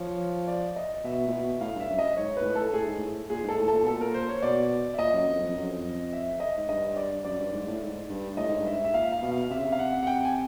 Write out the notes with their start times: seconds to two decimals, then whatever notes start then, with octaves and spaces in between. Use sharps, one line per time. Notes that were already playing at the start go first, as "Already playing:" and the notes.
Already playing: F3 C#5
0.48 D5
0.76 D#5
1.04 B2 E5
1.28 A#2
1.32 B2
1.60 A2 F5
1.75 G2 E5
1.90 F#2
1.99 D#5
2.17 G#2 C#5
2.37 A#2 B4
2.45 A2
2.55 A4
2.73 A2 G#4
2.86 G#2
2.99 A2
3.30 A#2 G#4
3.44 G#2 A4
3.58 A2
3.68 A#2 A4
3.82 B2 A4
3.92 A#2
4.01 A#4
4.14 C5
4.29 C#5
4.42 B2 D5
4.94 E5
4.99 A#2 D#5
5.13 F#2
5.28 F2
5.42 F2
5.55 F#2
5.69 F2
6.13 E5
6.40 D#5
6.57 G#2
6.69 G2 D#5
6.97 D5
7.25 F#2 D5
7.39 G2
7.53 G#2
7.68 A2
7.81 G#2
8.09 G2
8.37 A2 D#5
8.48 G#2
8.59 G2
8.66 G#2 E5
8.84 E5
8.94 A#2 F5
9.12 F5
9.22 B2
9.31 F5
9.51 C3 E5
9.59 C#3
9.67 C3
9.72 F5
9.79 F#5
10.03 F#5
10.07 G5
10.24 G#5